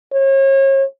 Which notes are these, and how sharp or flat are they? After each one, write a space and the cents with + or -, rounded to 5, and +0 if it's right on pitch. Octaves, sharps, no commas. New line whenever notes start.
C#5 -35